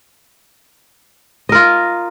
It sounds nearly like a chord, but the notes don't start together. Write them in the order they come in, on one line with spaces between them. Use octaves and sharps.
D#5 A#4 F4